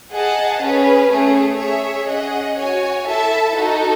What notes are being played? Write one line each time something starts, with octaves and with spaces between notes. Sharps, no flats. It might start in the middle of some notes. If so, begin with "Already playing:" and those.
G#4 D#5 F#5 A5
C#4 G#4 B4
A3 C#4 G#4
G#4 C#5 E5
C#4 G#4 D#5 F#5
F#4 C#5 G#5
E4 A4 E5 A5
D#4 F#4 A4